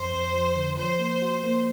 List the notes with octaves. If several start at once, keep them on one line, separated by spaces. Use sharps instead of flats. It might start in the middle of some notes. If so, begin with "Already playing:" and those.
Already playing: F2 C5
F2
F3
D3
F3 C5
A#3
F#4
A#3